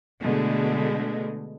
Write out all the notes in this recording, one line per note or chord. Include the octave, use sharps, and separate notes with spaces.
B2 D3 G#3 A3